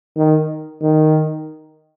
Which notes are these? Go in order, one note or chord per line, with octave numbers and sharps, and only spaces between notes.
D#3
D#3